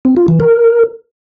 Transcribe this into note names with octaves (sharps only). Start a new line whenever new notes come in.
C4
F4
E3
A#4